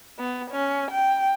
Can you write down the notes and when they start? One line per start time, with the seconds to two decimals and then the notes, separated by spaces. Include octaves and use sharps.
0.19 B3
0.51 C#4
0.91 G5